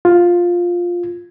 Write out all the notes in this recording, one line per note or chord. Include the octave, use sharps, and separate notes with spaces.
F4